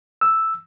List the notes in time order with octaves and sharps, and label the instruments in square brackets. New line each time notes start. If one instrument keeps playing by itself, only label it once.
[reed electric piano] E6